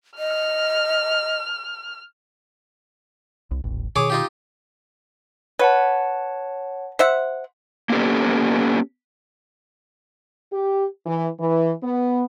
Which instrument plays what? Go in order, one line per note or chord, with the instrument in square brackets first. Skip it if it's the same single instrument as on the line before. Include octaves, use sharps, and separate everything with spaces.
[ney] D#5 [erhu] F6
[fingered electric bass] C2
D#1 A1
[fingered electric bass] B2 D#3 [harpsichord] G#4 C#5 D6
[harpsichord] D#4 F4 G4
[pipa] B4 [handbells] C#5 F#5 A5
[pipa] C5 E5 F#5
[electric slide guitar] A#3 B3 C#4 G4 A4
[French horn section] G4
E3
E3
B3